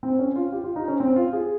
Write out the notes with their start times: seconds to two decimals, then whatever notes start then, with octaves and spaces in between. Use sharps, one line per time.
0.03 C4
0.19 C#4
0.36 F4
0.52 G4
0.64 F4
0.76 D#4
0.88 C#4
1.00 C4
1.16 F4
1.33 G#4